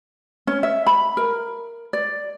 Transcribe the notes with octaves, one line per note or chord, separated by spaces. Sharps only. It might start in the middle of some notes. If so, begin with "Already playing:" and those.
C#4
E5
B5
A#4
D5